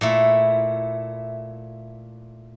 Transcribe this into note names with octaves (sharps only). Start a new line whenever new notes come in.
A#2 A3 E4